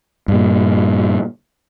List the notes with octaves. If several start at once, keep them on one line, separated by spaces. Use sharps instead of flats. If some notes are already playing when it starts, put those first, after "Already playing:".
G2 A#2